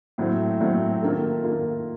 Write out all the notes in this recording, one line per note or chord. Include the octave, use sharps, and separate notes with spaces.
A2 F#3 A3 C4
A2 F#3 A3 C4
D#3 A#3 F4 A4
D#3 A#3 F4 A4